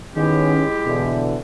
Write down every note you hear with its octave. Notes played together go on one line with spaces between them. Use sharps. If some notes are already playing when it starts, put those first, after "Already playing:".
D#3 G#3 B3 C#4 E4 G4
B2 D3 E3